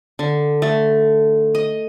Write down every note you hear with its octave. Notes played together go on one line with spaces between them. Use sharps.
D3
A3
D#5